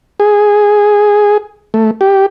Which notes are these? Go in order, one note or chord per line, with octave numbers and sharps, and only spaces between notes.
G#4
A3
G4